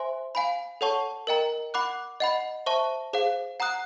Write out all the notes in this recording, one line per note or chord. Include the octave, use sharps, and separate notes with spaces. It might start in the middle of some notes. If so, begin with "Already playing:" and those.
Already playing: C5 E5 G#5 C6
F5 G#5 B5
A4 C#5 F#5 A5 C#6
A#4 D#5 G5 A#5
F#5 B5 D6 F#6
D#5 F#5 B5
C5 E5 A5 C#6
G#4 C5 F5
F#5 A#5 D#6 F#6